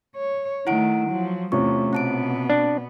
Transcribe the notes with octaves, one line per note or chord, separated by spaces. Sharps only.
C#5
D#3 A3 E4 F#5 D7
F3 F#3
E2 C3 A3 C#4 F4 C#6
B2 B3 C4 A5 D7
D4